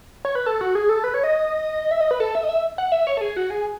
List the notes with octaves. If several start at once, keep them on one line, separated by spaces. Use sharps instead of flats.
C#5
B4
A4
F#4
G#4
A4
B4
C#5
D#5
E5
D#5
B4
A4
E5
D#5
E5
F#5
E5
C#5
A4
G#4
F#4
G#4